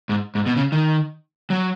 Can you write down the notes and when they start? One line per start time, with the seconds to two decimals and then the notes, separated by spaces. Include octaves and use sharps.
0.09 G#2
0.35 G#2
0.46 B2
0.56 C#3
0.72 D#3
1.50 F#3